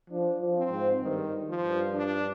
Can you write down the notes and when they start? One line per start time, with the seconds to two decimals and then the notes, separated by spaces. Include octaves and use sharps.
0.10 F3 D4
0.41 F3
0.57 C4
0.72 G#2
1.02 G2 D#3
1.49 F3
1.64 G2
1.95 D4